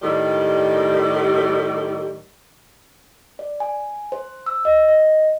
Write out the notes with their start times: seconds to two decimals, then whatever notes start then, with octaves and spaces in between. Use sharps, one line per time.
0.02 A2 D#3 G3
3.39 D5
3.60 G#5
4.12 C5
4.46 E6
4.65 D#5
4.88 D#5